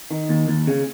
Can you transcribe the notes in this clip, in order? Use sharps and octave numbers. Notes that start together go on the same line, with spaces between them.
D#3
D#2
D#2
C#3